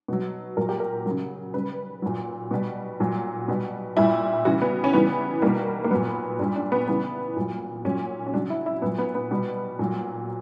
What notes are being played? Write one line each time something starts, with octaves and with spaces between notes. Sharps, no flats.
B2 F#3
A#2 F#3 A#4
G4
A#4
C#3 F#3
C#3 G3 B4
A#2 F#3
B2 G3
A#2 F#3
B2 G3
A#2 G3 E4
C#3 E3 G3 F#4
B3
C#4
C#3 E3 G3 B3
B2 G3 A#3
A#3
A#2 F#3 B3
A#2 G3 D4
D4
B3
C#3 E3 G3 B3
A#2 F#3
A#2 F#3 C#4
C#4
C#3 F#3 D4
E4
E4
A#2 F#3 B3
B3
B3
B2 G3
A#2 F#3